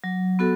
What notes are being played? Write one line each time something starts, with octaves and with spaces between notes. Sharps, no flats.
F#3
B3 F#4 A4